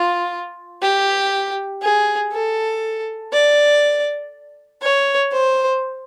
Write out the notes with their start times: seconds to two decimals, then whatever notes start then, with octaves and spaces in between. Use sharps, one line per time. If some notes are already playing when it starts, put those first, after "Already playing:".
Already playing: F4
0.82 G4
1.82 G#4
2.32 A4
3.33 D5
4.82 C#5
5.32 C5